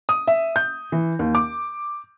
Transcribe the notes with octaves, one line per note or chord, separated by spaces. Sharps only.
D#6
E5
G6
E3
D#2
D6